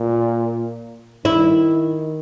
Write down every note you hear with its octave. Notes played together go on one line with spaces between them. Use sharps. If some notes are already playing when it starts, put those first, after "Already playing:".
Already playing: A#2
D#3 E4